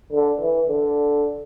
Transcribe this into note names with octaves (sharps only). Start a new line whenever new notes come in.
D3
E3
D3